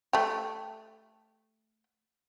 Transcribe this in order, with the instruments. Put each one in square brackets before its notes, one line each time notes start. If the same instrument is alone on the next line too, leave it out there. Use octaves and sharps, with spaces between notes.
[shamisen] A3 G4